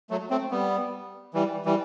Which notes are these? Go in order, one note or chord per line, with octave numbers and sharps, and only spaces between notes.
F#3 A3
A3 C4
G3 B3
E3 G3
E3 G3